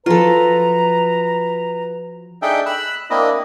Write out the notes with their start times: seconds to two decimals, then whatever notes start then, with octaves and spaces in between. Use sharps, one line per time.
0.06 F3 F4 F#4 A4 B4 A#5
2.42 D4 D#4 G#4 A4 E5 G5
2.66 B5 E6 F#6
3.10 A#3 C4 D4 E4 D#5